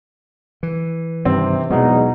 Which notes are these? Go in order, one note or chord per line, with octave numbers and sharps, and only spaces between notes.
E3
G2 C3 D#3 C4
E2 B2 F#3 G#3 D#4